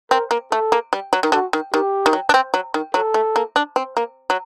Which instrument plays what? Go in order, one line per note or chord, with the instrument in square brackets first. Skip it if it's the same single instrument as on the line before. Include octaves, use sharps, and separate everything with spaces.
[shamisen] C4 [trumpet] A#4
[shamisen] A#3
[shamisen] A3 [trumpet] A4
[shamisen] A#3
G3
F#3
D#3
[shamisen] D3 [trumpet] F#4
[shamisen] D#3
[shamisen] D#3 [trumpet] G4
[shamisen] D#3
F#3
D4
C4
F#3
D#3
[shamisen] F#3 [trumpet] A4
[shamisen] A3
A#3
D4
C4
A#3
F#3